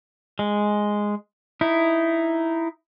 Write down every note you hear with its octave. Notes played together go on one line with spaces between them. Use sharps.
G#3
D#4 E4